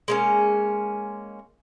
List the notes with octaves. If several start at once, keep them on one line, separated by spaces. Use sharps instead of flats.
G#3 A#3 C#4